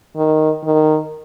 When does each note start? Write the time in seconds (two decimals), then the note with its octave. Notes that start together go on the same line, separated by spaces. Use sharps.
0.16 D#3
0.64 D#3